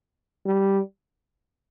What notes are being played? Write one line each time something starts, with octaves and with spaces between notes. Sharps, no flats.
G3